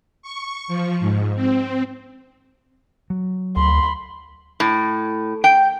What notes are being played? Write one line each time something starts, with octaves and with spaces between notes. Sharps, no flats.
C#6
F3
G#2
C4
F#3
D2 B5 C6
A2
G5